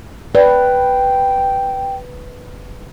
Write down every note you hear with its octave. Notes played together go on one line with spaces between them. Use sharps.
B4 D5 G5